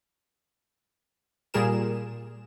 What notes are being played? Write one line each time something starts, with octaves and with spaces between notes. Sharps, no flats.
A#2 G3 G#4 A#4 E7